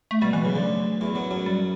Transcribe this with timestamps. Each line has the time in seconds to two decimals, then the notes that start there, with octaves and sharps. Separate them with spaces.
0.11 A3
0.22 B2 G3
0.33 B2 E3
0.44 C#3 F#3
0.55 D2 D3
1.01 E2 E3
1.15 F#2 F#3
1.31 F#2 F#3
1.46 G3